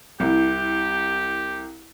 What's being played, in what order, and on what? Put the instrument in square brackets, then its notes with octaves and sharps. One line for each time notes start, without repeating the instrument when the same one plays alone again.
[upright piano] C2 E4 [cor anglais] G4